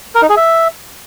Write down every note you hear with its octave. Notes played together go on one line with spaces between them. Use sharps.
A#4
D#4
G#4
E5